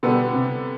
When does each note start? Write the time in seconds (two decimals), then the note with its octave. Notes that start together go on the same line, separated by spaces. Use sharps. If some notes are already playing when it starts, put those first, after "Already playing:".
0.03 B2 D3 G3 B3
0.33 C3